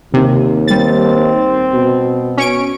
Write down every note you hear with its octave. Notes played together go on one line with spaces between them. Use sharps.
D#2 C3
G3 C4 A6
B2
C#4 C#6 D7